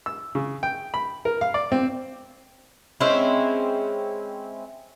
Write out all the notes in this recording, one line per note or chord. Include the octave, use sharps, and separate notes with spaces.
E6
C#3
G5
B5
A#4
F5
D5
C4
G#3 C4 C#4 E4